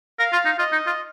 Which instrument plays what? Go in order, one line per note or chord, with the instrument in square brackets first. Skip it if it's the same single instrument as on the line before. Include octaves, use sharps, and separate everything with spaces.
[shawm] A#4 [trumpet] F5
[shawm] F4
D#4
[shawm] F4 [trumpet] D#5
[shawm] D#4
F4